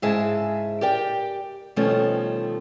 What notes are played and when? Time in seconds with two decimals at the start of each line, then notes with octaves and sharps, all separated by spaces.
0.02 G#2 C#3 E4 G#4 E5 A5
0.81 G4 A#4 D5 G5
1.76 B2 D#3 F3 G3 A3 C#4